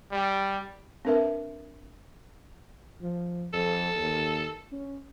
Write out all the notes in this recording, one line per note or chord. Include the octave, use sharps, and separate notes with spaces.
G3
C4 D4 A#4 B4 E5
F3
F2 A4
D#2
C#4